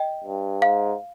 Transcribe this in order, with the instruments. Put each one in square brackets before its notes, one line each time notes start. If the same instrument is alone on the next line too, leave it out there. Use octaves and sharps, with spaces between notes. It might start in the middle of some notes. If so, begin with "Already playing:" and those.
Already playing: [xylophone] D#5 G5
[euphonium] G2
[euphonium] G#2 [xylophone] F5